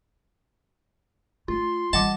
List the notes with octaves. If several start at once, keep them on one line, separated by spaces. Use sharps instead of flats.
A3 F4 C6
E3 G3 D#5 F#5 A5 D6